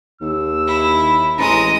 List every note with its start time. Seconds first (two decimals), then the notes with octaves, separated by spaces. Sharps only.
0.21 D#2 E6
0.67 E4
1.38 A1 G#3 A#5 D#6